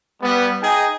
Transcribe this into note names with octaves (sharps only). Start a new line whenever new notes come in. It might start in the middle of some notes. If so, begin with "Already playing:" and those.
G3 B3
D#4 G#4 D#5 G5 G#5